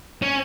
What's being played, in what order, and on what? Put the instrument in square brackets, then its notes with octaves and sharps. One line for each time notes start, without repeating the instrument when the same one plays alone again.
[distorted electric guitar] C#4